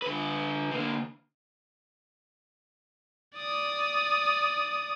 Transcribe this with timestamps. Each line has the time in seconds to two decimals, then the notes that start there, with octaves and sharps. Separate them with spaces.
0.02 D3 B4
0.71 D3 A#3
3.36 D5 D#6